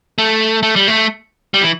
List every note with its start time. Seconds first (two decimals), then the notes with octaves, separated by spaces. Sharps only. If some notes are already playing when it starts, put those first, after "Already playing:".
0.18 A3
0.63 A3
0.76 G3
0.88 A3
1.54 G3
1.62 E3